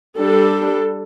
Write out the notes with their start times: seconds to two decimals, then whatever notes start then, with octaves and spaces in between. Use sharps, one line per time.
0.18 G3 D4 A4